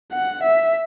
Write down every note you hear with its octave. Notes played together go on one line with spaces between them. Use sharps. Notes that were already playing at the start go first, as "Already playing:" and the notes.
F#5
E5